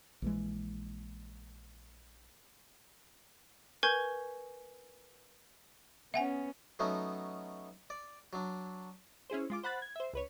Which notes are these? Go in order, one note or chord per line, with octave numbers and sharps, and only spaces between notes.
A#1 E3 G#3
A#4 B4 G#5 C#6 G6 G#6
B3 C#4 E5 F#5 G#5
F#3 A3 B3 C#4 D#4
D5
F#3 D4
C#4 E4 G#4 C5
G#3 F4 D6
C5 F#5 B5 F#6 A6
G#6
C5 E5
C#2 B4 C#5